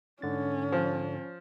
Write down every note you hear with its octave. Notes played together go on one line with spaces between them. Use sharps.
G#2 D3 C#4 A6
F3